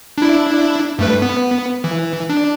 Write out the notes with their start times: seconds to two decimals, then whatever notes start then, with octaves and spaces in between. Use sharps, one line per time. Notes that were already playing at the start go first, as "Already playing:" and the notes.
0.18 D4 E4
0.99 G2 A3 B4
1.22 B3
1.84 E3
2.30 D4